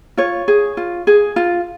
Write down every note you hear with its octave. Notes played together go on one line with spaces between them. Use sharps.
F4 C#5
G#4
F4
G#4
F4